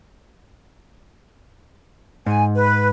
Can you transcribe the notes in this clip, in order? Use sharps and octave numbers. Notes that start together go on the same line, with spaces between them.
G#2 G#5
B4